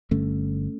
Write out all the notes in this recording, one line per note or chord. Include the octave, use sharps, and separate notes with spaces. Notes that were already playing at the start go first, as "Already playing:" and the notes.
G1 G2 D3 A3 C#4